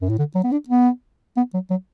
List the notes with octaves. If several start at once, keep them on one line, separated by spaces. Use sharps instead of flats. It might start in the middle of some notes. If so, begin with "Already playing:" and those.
F#2
A2
D3
F#3
B3
D4
B3
B3
F#3
F#3